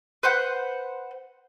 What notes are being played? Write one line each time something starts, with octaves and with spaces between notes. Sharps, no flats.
B4 C5 F#5